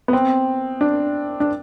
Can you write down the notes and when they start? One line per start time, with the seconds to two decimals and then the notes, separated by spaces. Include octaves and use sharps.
0.08 B3
0.13 C4
0.81 D4
1.40 D4